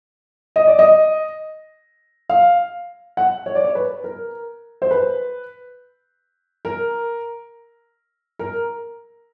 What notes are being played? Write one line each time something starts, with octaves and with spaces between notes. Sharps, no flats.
D#5
D5
D#5
F5
F#5
C#5
D5
C#5
B4
A#4
C5
B4
A#4
A#4